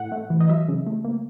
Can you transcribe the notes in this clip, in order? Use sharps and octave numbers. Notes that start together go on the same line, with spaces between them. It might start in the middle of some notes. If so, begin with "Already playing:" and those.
Already playing: A2 F#5
A3
E3
D#5
F#3 E5
C#3
A3
A#3